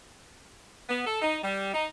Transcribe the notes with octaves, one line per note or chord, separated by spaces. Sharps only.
B3
A4
D#4
G3
D#4